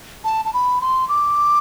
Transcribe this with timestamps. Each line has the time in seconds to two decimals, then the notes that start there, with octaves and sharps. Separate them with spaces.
0.24 A5
0.45 A5
0.53 B5
0.81 C6
1.09 D6